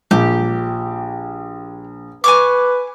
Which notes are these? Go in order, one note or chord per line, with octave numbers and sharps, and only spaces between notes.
A#1 G4
B4 G#5 C#6 D6